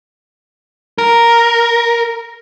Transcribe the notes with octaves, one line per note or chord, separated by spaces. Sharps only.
A#4